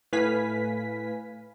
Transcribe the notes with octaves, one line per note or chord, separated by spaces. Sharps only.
A2 B4 F5 G#5 B6